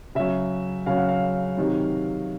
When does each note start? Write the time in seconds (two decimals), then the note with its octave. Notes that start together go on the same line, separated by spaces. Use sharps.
0.15 C#3 F#3 E5
0.86 C#3 F#3 F5
0.97 F#5
1.08 F5
1.57 C3 D#3 F#3